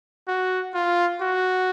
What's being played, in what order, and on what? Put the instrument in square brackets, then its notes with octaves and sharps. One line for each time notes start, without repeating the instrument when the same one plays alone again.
[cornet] F#4
F4
F#4